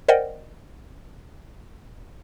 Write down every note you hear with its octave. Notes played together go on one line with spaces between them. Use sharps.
A#4 C5 D5 D#5 F#5 G5